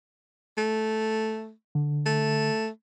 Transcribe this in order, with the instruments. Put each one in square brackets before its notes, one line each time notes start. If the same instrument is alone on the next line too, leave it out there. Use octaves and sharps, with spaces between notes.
[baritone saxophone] A3
[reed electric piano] D3
[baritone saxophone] A3